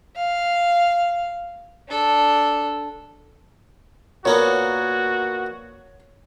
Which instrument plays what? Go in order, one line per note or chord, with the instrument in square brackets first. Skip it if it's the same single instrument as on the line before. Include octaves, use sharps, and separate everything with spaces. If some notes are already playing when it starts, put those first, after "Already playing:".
[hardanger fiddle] F5
D4 A4
[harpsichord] A#2 A#3 B3 [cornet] F#4 [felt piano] C#5